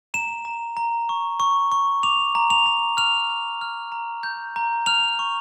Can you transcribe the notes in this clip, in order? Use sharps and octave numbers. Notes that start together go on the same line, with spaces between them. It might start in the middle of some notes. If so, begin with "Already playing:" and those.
A#5 E7
A#5
A#5
C#6
C#6
C#6
D6 F7
A#5
F7
A#5
F6 F7
F6
F6
A#5
G6
A#5
F6 F7
C#6